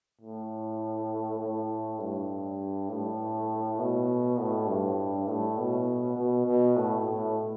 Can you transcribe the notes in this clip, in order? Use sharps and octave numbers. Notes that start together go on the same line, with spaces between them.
A2
A2
G2
A2
B2
A2
G2
A2
B2
B2
B2
A2
A2